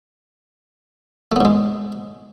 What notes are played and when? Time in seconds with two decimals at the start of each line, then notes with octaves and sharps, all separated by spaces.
1.32 A3
1.36 B3
1.41 G#2
1.45 G#3